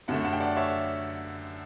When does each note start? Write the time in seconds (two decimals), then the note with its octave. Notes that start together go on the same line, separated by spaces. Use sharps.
0.08 F#2 D3 A3 F#5 A5
0.24 F#5 A5
0.33 G5
0.40 D5 F#5
0.57 C#5 E5